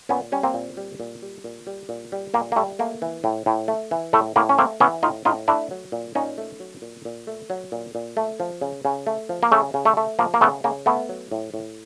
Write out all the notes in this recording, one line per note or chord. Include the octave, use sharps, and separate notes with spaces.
A#2 B3 C#4
G3 C#4
A#3 C4
A#2
G3
A#2
G3
A#2
G3
A#2
G3
A#2 A#3
A#3
G3 A3
A3 A#3
E3
A2
A2
A3
E3
A2 A3
A2 A#3
C#4
A3 A#3 C4
E3 B3 C#4
A2 D#4 F4
A2 D#4 F4
A3 D4 E4
F#3
A#2
A#2 C#4 D#4
A3
F#3
A#2
A#2
A3
F#3
A#2
A#2
A3
F3
C#3
C#3
A3
F3
A#3
C#3 A3
C#3
A3
A3
F3 A#3
A#3
C#3 A3 B3
C#3 A#3
A3 B3
F#3
A2
A2